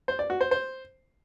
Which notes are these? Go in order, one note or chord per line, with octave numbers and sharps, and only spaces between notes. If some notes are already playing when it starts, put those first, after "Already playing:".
C5
D5
F#4
C5
C5